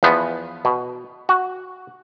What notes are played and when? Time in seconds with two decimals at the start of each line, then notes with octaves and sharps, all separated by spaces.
0.03 E2 F3 B3
0.65 B2
1.29 F#4